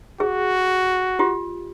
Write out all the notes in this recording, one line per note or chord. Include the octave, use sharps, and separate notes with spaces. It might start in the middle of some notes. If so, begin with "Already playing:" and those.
F#4 G#4
F4 G4